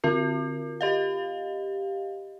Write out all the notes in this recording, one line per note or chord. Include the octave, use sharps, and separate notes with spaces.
D3 C4 F4 A#4
G4 D#5 F5